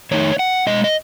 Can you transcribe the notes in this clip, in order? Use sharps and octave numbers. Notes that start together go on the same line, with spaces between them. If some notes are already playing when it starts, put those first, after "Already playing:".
D#3 A3 D#4 C#5
F#5
B2 G#3 D#5
D#5